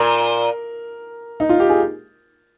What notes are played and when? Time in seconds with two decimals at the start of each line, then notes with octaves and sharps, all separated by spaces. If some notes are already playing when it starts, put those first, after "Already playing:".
Already playing: A#2 A#4
1.40 D#4
1.49 F4
1.60 G4
1.70 G#4